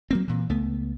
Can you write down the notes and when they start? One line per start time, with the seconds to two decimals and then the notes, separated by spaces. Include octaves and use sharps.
0.11 F#3 A#3 C4
0.28 A#2 E3
0.50 C#2 A3 B3